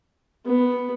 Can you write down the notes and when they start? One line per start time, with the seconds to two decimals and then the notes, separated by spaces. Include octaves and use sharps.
0.46 B3